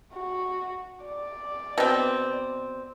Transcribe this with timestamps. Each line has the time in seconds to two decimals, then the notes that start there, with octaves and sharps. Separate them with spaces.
0.14 F#4
1.04 D5
1.78 B2 C4